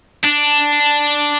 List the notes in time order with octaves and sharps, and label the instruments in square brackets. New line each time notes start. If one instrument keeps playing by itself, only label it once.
[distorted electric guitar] D4